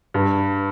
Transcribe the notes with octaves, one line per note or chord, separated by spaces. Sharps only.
G2